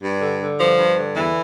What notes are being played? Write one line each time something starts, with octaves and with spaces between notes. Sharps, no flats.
G2
D3
D3
G2 F3
G2
D3
E2 E3